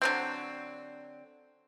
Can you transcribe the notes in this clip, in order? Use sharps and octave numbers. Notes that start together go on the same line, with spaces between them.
D3 F#3 C4